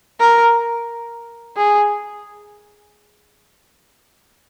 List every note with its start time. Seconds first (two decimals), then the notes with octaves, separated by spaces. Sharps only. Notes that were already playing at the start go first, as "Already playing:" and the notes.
0.20 A#4
1.57 G#4